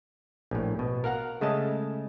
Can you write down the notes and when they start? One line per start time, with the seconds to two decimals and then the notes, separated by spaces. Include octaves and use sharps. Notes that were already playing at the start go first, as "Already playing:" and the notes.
0.51 A#1 A2
0.79 B2
1.04 A#4 F5 F#5 A#5
1.41 C#3 G#3 A3 D#5 A5